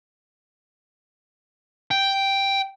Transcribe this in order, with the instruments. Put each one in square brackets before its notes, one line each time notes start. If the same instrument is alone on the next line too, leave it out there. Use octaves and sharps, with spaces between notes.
[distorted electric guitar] G5